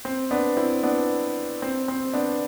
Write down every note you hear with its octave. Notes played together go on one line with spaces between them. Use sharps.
C4
B3 D4
C4 E4
B3 D4
C4
C4
B3 D4